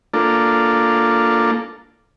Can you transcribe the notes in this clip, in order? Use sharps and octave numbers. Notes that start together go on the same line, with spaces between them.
A#3 D4 F4 A4